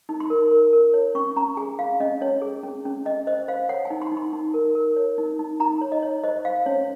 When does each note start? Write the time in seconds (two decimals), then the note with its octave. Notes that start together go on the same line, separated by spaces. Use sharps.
0.09 D#4
0.20 C6
0.30 A#4
0.51 A#4
0.73 A#4
0.94 C#5
1.15 C#4 C#6
1.36 C#4 A#5
1.57 G#4 G#5
1.79 C#4 F5
2.00 C#4 D#5
2.21 C#4 C#5
2.42 G#4
2.63 C#4
2.85 C#4
3.06 C#4 D#5
3.27 C5 D#5
3.48 C5 F5
3.69 C#5 F#5
3.85 G#5
3.90 D#4
4.02 C6
4.11 D#4
4.17 C6
4.33 D#4
4.54 A#4
4.75 A#4
4.96 C#5
5.18 D#4
5.39 D#4
5.60 D#4 A#5
5.81 C#5
5.92 D#5
6.03 C#5
6.24 C5 D#5
6.45 C5 F5
6.66 C#4 C#5